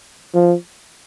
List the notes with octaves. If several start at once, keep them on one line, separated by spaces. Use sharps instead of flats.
F3